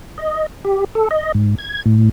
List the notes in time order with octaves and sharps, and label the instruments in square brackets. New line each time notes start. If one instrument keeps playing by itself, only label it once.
[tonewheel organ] D#5
G4
A4
D#5
G#2
G#6
A2